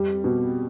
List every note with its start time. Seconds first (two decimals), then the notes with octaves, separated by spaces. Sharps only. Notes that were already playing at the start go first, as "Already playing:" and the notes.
Already playing: F2 G3
0.24 B2